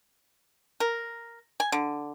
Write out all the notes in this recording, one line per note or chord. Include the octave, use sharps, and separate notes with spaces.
A#4
G#5
D3